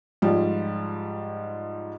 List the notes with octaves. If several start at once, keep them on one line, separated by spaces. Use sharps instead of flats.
G#2 F3 G3